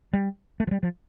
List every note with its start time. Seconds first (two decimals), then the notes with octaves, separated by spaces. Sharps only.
0.13 G3
0.60 A3
0.67 F3
0.71 G3
0.83 F3